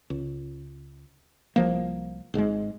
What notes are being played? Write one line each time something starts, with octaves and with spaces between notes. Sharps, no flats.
C#2
C2 F3 A#3
G#1 G#2 D3 G#3